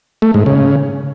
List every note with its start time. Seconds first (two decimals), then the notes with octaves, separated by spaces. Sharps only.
0.22 A3
0.34 G#2
0.46 C#3